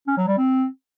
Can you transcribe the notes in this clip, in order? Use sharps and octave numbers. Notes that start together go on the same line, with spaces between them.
C#4
F#3
G3
C4